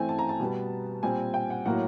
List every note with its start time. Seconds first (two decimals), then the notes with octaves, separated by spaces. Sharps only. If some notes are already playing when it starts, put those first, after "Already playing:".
Already playing: E3 A3 C4 G#5
0.09 A5
0.19 A#5
0.29 A5
0.40 B2 G3 B3
1.03 A#2 G3 C4 G#5
1.34 G5
1.50 F#5
1.65 A2 F#3 A#3 F#5